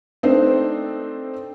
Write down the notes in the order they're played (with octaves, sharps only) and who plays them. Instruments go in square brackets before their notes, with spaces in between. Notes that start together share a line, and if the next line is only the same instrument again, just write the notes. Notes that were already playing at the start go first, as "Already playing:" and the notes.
[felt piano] A3 C4 D4 D#4 A4 C5